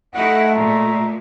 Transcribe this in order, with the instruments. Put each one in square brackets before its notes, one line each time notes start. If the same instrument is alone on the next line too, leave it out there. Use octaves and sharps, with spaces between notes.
[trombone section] A3 [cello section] D#4 E4 F#4 [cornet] F#5
[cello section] A#2 G#3 [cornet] A#5